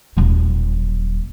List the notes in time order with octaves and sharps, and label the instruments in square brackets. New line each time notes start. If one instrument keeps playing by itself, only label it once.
[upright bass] D#1 F#3